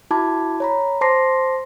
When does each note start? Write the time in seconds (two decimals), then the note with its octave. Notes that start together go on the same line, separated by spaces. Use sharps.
0.11 E4 F#4 A5 B5 D6 G#6
0.60 C#5 A#5 B5
1.01 C5 A5 C6 D6 A#6 C7